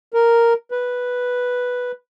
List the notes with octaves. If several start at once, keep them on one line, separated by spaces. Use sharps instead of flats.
A#4
B4